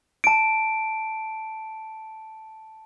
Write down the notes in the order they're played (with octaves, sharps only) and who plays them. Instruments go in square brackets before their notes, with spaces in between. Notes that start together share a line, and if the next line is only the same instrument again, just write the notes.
[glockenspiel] A5 D7